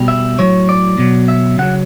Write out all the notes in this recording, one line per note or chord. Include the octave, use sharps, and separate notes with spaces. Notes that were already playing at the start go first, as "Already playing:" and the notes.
Already playing: B2 G3
E5
A2 F#3 C#5
D5
B2 F#3
E5
C#3 F#3 F#5